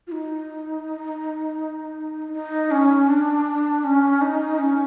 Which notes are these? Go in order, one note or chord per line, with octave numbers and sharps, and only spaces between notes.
F4
D#4
D#4
C#4
D4
C#4
D#4
C#4